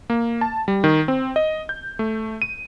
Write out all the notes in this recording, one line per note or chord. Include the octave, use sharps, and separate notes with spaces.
A#3
A5
G3
D#3
C4
D#5
G6
A3
D#7